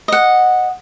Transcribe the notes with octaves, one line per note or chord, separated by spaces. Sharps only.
D#5 F#5